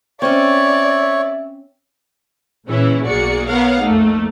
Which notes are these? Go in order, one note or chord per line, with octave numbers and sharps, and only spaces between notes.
C4 C#4 C#5 D5 E5
A#2 C#3 E3 C#4 E4
B1 A#3 F#4 G#4 D5 C#7
B3 A#4 C#5 F5 F#5
F2 A3 A#3 D#4